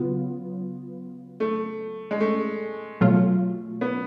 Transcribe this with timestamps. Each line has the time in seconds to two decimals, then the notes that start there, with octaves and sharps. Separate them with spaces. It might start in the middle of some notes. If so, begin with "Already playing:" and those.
Already playing: C#3 F#3 B3 F4
1.40 A3
2.11 G#3
2.21 A3
3.01 B2 F#3 A3 F4
3.81 B3